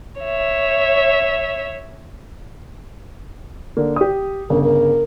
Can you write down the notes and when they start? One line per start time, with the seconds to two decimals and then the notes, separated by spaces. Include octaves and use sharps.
0.20 C#5 E5
3.77 D3 A#3
3.96 G4 D#6
4.50 G1 C#3 A#4
4.63 A#4